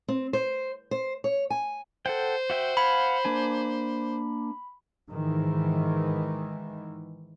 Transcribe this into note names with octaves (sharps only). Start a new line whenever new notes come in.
C4
C5
C5
C#5
G#5
A4 C5 F#5 G5
F#4 E5 G5
F5 F#5 G#5 B5
A#3 D4 G#5
G#2 D#3 E3